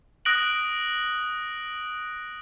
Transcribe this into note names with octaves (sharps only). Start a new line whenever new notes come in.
D#6 F#6 A#6 D7 F#7